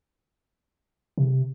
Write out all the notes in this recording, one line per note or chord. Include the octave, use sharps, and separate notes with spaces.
C3